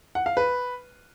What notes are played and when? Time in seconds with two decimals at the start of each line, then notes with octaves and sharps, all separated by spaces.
0.15 F#5
0.26 F5
0.37 B4